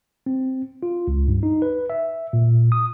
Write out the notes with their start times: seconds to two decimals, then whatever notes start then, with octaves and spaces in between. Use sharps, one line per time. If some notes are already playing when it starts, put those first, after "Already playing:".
0.26 C4
0.83 F4
1.08 C#2
1.28 G2
1.43 D#4
1.62 B4
1.90 E5
2.33 A#2
2.72 D#6